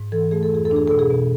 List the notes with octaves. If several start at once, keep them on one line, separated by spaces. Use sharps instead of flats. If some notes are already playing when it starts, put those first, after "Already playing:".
Already playing: G#2
E3 A4
A3 G#4
A4
F2 G#4
A4
D4
G#4
B2 A4
G#4
B2